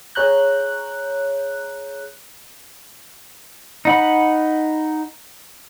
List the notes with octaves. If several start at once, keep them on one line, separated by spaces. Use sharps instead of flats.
G#4 C#5 A#5 F#6 G6
D#4 F#5 B5